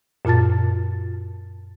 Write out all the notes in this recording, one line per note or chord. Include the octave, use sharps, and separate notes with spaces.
F#2 A#2 F4 A5 A6